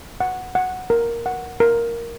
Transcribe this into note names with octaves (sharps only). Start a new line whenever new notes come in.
F#5
F#5
A#4
F#5
A#4